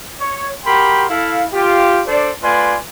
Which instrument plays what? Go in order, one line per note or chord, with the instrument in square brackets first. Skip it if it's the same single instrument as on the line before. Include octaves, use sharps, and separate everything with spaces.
[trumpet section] C#5
F#4 G4 A#4 G5 B5 C6
E4 A4 F5
F4 G4
D4 A4 C5 D5
A3 F4 B4 D5 G#5 C6